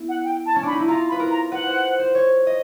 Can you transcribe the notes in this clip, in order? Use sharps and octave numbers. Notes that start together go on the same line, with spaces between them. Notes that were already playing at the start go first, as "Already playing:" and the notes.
Already playing: B3 E4
F#5
G5
A5
C#4
D4 B5
D#4
E4
F4 A#5
B5
B4
A#4
A#5
B4 F#5
C5
C5
C#5
D#5